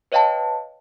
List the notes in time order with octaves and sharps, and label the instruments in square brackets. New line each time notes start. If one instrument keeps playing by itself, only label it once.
[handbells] B4 C#5 D#5 F5 G5 A5